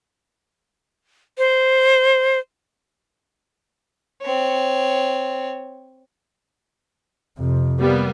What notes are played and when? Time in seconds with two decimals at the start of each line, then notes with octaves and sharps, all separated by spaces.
1.38 C5
4.21 C4 C#5
7.38 F2 C3
7.79 G3 A#3 B3